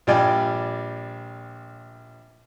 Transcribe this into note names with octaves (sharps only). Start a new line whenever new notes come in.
A#1 G3 F4 D5 G5 G#5